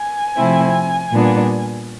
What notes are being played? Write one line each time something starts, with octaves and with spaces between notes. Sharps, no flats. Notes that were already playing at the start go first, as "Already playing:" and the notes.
Already playing: G#5
C3 F3 A3 C4 E4
A#2 G3 B3 D4